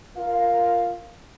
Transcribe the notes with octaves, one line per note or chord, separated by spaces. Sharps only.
F4 A#4 F5